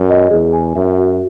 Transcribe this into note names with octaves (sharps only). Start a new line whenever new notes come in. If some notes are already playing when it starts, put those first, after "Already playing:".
Already playing: F#2
D#5
E2 G#4
G#5
F#2 E5
F#4